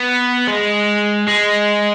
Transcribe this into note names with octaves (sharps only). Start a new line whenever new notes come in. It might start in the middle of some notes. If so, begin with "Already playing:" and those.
Already playing: B3
G#3
G#3